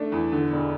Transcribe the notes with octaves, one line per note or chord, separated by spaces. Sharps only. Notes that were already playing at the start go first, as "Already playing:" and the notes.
Already playing: A3 D4
E2
D3
E1